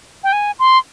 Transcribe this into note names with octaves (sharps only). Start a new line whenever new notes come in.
G5
G#5
C6